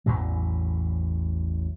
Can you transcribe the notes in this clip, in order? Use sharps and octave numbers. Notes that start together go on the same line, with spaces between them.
A1 E2 A2 F#3